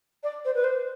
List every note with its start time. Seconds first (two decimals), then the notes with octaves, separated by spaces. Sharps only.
0.23 D5
0.44 C5
0.54 B4
0.64 C5